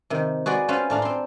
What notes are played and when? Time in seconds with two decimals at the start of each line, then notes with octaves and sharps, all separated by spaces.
0.10 C3 D#3
0.46 F#4 G#4 B4 D5 C6
0.68 C4 C#4 F4 B4 C5 F5
0.90 A2 D4 F5 A#5
1.02 C4 C6